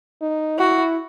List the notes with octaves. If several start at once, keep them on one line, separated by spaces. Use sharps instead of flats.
D#4
E4 F#4